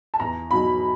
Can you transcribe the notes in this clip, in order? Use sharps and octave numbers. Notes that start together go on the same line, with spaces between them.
A5
E2 A#5
B2 F#3 B5